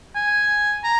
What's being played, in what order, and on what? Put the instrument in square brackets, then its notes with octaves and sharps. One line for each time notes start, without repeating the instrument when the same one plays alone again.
[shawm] G#5
A#5